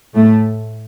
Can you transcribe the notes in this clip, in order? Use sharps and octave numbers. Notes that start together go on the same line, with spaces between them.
A2 A3